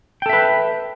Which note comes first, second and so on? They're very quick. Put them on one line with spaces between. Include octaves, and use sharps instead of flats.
G5 A4 E5 B4